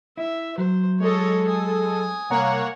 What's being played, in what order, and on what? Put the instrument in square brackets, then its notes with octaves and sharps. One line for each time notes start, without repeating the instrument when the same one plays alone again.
[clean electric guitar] E4 [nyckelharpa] E5
[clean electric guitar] F#3 [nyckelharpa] C5
[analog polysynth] G#3 A4 [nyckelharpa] C#5 D#5
[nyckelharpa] G#5 D#6
[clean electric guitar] C2 A#5 [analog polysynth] A#3 C#5 F#5